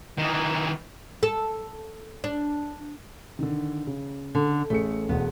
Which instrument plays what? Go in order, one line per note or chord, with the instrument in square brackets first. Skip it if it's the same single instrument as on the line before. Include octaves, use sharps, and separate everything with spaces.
[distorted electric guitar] D#3 E3
[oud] A4
D4
[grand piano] D3 D#3
C#3
[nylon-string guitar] D3
[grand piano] A1 G#4 C#7 [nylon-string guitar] A3
[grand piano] E1 E2 [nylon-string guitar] B3